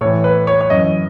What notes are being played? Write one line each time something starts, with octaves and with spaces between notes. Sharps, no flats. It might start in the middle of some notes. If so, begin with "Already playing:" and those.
A2 E3 C#5
B4
C#5
C#5
F#2 E3 D#5